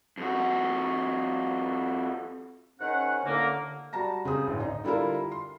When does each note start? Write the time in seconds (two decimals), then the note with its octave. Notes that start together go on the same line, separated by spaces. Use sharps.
0.18 F2 F#4
2.80 G#2 D#3 C#4 F#5
3.25 D#2 A2 D3 A#3
3.93 G3 F#4 A5 A#5 A#6
4.25 C#3 G#3 C4 D#6
4.47 A1 D2
4.60 D#4
4.84 D3 G3 E4 F4 A4 A#4
5.32 C6